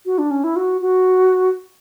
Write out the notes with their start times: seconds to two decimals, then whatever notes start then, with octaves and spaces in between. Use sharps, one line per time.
0.06 F#4
0.18 D4
0.31 C#4
0.44 E4
0.56 F#4
0.81 F#4